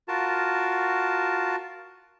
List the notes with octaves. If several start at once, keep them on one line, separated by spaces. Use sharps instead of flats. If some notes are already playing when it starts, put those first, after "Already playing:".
F4 F#4 A#4 A5